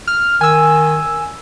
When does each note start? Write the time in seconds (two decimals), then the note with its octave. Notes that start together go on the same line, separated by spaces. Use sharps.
0.07 F6
0.41 D#3 G#5 E6